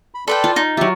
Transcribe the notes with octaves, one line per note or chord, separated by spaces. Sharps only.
B5
A4 B4 D5 G5 A5 C6
F4
D#4
F#3 F4 G4 E5